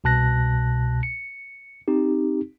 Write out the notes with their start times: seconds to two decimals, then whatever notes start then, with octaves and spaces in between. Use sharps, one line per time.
0.04 C2 B2 A5 F#6 A#6
1.03 C#7
1.88 C4 D#4 G4